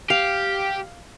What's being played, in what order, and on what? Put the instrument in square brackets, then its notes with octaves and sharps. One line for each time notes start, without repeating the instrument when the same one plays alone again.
[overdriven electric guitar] G4 [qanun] F5